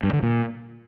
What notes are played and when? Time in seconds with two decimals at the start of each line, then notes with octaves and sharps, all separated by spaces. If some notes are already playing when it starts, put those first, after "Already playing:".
0.03 G2
0.13 D3
0.23 A#2